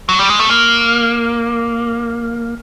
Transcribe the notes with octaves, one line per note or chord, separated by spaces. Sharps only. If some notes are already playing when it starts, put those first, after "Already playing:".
F#3
G3
G#3
A3
A#3